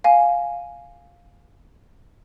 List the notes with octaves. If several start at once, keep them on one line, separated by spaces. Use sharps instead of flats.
F5 G#5